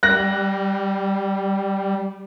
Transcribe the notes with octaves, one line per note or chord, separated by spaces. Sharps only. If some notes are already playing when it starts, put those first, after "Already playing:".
G3 F#6 A#6